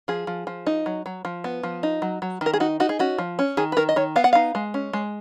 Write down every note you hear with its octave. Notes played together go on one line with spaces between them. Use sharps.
F3 G#4
F3
F3
D#4
F#3
F#3
F3
B3
F3
D#4
F#3
F#3
D#3 A#4
G#4
D#4 F#4
D#4 F#4
G#4
C#4 F#4
F3
C#4
D#3 G#4
B4
D#3 A#4
D#5
D#3 C#5
B3 F5
F#5
D#4 F5
G#3
C#4
G#3